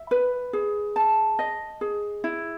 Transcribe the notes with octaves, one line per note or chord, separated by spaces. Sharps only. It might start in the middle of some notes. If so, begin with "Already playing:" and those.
Already playing: E5
B4
G#4
A5
D#5
G#4
E4